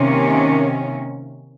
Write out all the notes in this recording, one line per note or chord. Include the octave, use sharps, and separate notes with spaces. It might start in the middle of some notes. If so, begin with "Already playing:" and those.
Already playing: C3 D#3 A#3 C#4